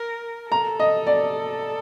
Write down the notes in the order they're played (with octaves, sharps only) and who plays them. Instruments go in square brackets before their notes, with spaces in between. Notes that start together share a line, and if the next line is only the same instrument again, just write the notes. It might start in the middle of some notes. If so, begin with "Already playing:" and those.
Already playing: [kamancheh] A#4
[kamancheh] A4 [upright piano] A#5
[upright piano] D#5
D5